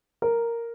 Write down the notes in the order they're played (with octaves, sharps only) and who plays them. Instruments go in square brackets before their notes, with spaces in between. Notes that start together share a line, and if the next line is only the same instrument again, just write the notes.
[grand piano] A#4